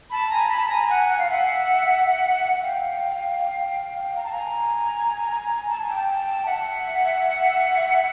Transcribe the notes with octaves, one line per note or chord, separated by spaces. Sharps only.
A5 B5
G#5 A#5
A5 B5
G#5 A#5
F#5 G#5
F#5
F5
E5 F#5
F#5
F5 G5
A#5
A5
G#5 A#5
A5
G#5
G5 A5
E5 F#5